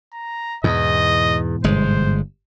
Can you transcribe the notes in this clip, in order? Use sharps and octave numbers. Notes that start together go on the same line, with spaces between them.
A#5
E2 G#2 B2 E3 D#5
G1 G#3 C5